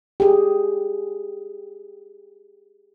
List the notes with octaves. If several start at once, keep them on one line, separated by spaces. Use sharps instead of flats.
G4 G#4